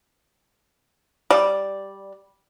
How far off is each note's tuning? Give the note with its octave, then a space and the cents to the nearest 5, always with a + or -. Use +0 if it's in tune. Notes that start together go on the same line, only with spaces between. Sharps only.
G3 +0 D5 +0